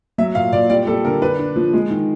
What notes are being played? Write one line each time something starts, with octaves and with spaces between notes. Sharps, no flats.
F#3 E5
A#2 F5
A#2 D5
G3 D5
G3 A4
D3 A#4
D4 B4
D4
F3
G#3
D#3